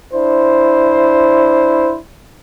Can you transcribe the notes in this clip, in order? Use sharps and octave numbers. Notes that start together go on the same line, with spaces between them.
D4 E4 C5